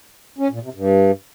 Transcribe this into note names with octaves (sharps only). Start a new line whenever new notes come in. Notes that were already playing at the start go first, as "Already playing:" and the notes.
C#4
A#2
C3
G2